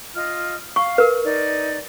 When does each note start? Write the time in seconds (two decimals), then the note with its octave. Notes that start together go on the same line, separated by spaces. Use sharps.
0.14 F4 D#5 F6
0.76 F5 C#6
0.98 A#4 B4
1.25 D#4 D5